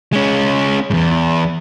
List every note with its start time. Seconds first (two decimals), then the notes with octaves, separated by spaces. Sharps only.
0.13 G#3 C#4
0.90 E2 G#2